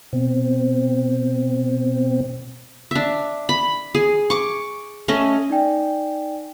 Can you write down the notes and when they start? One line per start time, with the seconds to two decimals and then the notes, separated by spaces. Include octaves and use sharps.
0.13 B2 C4
2.91 D4 E5
3.49 B5
3.95 G#4
4.30 C#6 D6
5.08 A3 C#4 D#5
5.50 D#4 D5 G5 G#5